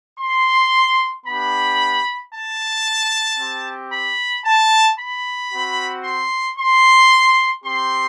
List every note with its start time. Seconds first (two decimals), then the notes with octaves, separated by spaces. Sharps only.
0.19 C6
1.26 B3 D4 G4 B5
2.33 A5
3.38 C4 G4
3.92 B5
4.44 A5
4.98 B5
5.51 C4 F#4
6.04 C6
6.57 C6
7.63 C4 G4 C6